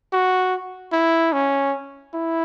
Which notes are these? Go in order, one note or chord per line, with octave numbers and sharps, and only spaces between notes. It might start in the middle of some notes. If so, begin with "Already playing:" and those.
F#4
E4
C#4
E4